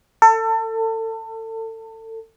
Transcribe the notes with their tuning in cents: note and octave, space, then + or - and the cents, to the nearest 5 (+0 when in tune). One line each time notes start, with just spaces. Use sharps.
A4 +30